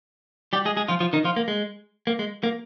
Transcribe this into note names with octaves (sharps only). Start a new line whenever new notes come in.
G3 G4
G#3 G#4
G#3 G#4
F3 F4
F3 F4
D#3 D#4
F3 F4
A#3
G#3
A#3
G#3
A#3